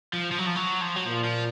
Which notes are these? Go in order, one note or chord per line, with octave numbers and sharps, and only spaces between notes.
F3
F3
F#3
F3
F#3
F3
F#3
A#2 F3
F3